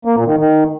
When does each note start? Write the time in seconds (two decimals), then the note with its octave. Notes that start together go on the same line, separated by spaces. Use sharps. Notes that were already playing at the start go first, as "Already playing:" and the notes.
0.05 A#3
0.16 A#2
0.27 D#3
0.37 D#3